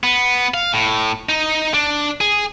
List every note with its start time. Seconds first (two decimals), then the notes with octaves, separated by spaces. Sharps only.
0.04 B3
0.54 F5
0.73 A2
1.29 D#4
1.74 D4
2.21 G#4